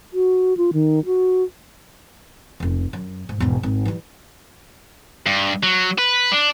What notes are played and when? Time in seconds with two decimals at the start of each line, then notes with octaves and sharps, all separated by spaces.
0.13 F#4
0.57 F4
0.73 D#3
1.05 F#4
2.60 F1 C#2
2.93 F#2
3.29 G#2
3.40 E1 G#2
3.63 G#1
3.85 E3 G3
5.26 G2
5.63 F#3
5.98 B4
6.32 D4